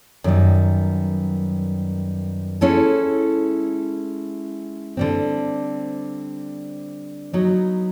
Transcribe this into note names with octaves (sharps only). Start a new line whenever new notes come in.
F#2 D#3 G3 B3
G#3 C#4 E4 A4
D3 G3 C4
F#3 B3 D#4